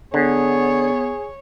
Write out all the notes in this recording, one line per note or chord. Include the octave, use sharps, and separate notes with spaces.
D3 B3 G#4 C#5